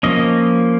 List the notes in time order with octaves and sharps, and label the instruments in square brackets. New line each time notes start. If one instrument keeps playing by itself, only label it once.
[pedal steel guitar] F3 A#3 C#4 D#5